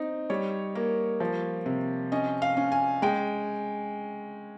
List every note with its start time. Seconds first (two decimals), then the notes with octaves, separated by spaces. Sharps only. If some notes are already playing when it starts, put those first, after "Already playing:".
Already playing: C4 D#4
0.30 G3 C#5
0.75 A#3
1.20 F3
1.66 C3
2.12 C#4 D#5
2.42 F5
2.57 C#4
2.72 G#5
3.02 G#3 G5